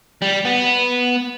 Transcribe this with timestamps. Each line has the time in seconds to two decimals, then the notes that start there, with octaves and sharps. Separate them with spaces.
0.22 G3
0.45 B3